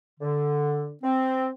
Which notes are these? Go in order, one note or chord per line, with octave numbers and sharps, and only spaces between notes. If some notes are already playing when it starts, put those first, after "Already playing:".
D3
C4